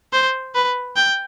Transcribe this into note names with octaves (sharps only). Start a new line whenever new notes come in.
C5
B4
G5